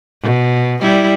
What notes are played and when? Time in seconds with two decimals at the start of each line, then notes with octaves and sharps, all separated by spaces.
0.22 B2
0.81 G3 E4